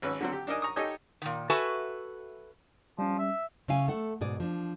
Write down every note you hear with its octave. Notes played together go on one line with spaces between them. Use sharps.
G#1 C#4 B4 E6
D3 F#3 C4
G4
D4 D#4 A#4 D#5 G#5
A#5 C#6 D#6
D#4 G4 A4 C#5 D#5 G#5
A#2 D#3
F#4 A4 B4 E5 G#5
F3 G3 C#4
E5
C#3 C#4 E4 F5 G#5
A3 A4 F#5
G#2 B2 G#4 D5
F3 D4